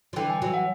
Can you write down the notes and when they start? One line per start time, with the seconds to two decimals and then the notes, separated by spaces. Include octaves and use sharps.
0.13 F3
0.16 D3 E3 G5
0.30 G#5
0.42 E3 F#3
0.54 F#5